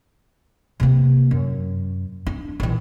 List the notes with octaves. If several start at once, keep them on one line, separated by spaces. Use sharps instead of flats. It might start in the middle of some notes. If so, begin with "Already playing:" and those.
C3 A#3
F#2
D4
A#1 E3